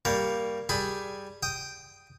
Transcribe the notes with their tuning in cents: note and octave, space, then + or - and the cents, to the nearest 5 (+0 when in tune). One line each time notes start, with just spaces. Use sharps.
G3 +0 A#3 +0 C#5 +25
G3 +0 G#4 +0 B5 +20
G5 +0 D#6 +0